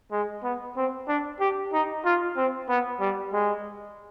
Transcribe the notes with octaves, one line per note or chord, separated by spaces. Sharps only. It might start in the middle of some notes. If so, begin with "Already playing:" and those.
G#3
B3
C4
D4
G4
D#4
F4
C4
B3
G3
G#3